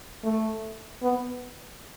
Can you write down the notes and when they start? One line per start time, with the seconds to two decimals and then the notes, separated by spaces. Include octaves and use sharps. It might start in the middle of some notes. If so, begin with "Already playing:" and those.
0.24 A3
1.03 B3